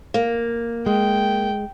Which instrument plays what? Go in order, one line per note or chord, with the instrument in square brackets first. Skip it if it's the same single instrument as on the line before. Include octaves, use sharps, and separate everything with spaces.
[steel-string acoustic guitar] A#3
[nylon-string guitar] G#3 [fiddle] G5